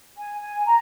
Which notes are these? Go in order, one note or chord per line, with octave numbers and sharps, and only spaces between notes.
G#5
G#5
A#5